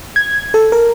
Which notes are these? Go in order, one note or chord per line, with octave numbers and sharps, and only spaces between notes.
G#6
A4
A#4